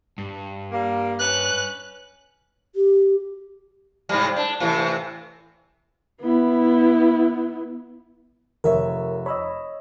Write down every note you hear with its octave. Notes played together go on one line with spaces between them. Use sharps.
G2
G3 A#3
C#4 B4 F#6
G4
G#2 C3 G3
D4
A2 C3 E3
B3 E4
F1 A#4 C#5 E5
C#5 D#5 B5 E6